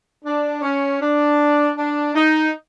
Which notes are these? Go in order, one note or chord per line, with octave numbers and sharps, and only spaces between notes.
D4
C#4
D4
D4
D#4